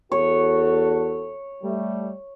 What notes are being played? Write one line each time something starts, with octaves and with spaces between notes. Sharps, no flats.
E2 F#4 A4 C#5
G3 A3